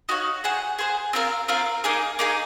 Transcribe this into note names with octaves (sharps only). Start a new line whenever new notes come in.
D#4 F#4 C#5 F5
G#4 C5 F#5
G#4 C5 F#5
C4 F4 A#4 F5
C4 F4 A#4 F5
A#3 D#4 G#4
A#3 D#4 G#4